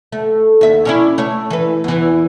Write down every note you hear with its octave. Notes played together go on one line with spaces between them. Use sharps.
A3
D#2 E5
C#4 D4 E4
A3 C#5
E3 B4
E2 E3